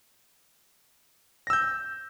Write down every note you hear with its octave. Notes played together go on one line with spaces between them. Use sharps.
E6 G6 A#6